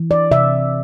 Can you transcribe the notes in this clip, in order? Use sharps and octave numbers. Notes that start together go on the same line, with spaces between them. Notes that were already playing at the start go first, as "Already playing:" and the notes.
Already playing: E3
D5
C3 E5